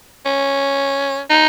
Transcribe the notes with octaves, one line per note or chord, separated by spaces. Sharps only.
C#4
D#4